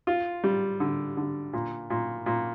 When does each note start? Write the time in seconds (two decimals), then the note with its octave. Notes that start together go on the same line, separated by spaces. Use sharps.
0.07 F4
0.44 G3
0.80 D3
1.17 D3
1.53 A#2
1.90 A#2
2.26 A#2